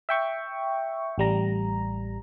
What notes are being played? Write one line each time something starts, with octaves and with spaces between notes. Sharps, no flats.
E5 G5 C#6
A1 G3 A#5